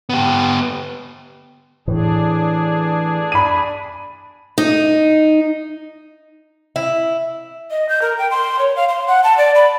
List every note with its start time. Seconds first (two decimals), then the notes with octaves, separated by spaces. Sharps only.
0.10 B3 G4
1.88 A2 E3 D4 G#4
3.32 B5 D#7
4.58 D#4
6.76 E4
7.71 D#5
7.89 G6
8.02 A#4
8.19 G5
8.31 C6
8.59 C#5
8.76 F5
8.89 C6
9.08 F#5
9.24 A5
9.37 D5
9.55 B5